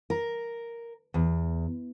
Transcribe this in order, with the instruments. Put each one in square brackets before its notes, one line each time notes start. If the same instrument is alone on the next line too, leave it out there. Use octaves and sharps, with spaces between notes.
[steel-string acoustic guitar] A#4
E2